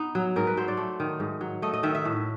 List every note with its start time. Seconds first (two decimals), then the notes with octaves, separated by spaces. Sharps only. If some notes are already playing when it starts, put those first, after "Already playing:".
Already playing: B3 D#4
0.15 F#3
0.36 G#2 A#4
0.47 B4
0.57 F#3 C5
0.68 D5
0.77 A3
1.00 D#3
1.20 G#2
1.41 F#3
1.62 A3 D#5
1.74 D#5
1.83 D#3 E5
1.95 E5
2.05 A2